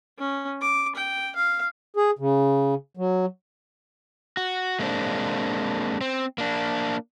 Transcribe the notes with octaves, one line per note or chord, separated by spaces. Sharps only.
C#4
D6
G5
F5
G#4
C#3
F#3
F#4
G#3 A#3 C4 D4
C4
A#3 D4